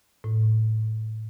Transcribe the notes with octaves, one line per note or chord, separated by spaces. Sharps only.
A2